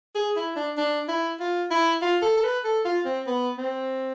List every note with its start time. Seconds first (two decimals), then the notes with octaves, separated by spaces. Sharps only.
0.15 G#4
0.36 E4
0.56 D4
0.77 D4
1.08 E4
1.40 F4
1.71 E4
2.02 F4
2.22 A4
2.37 A4
2.44 B4
2.64 A4
2.85 F4
3.05 C4
3.27 B3
3.58 C4